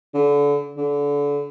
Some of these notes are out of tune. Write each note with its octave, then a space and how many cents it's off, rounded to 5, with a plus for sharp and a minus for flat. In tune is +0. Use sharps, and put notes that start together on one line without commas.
D3 -30
D3 -30